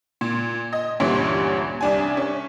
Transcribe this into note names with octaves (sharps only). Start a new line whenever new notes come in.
A#2
D#5
D2 G2 A#2 E3 C#4
C2 D4 G#5
C#4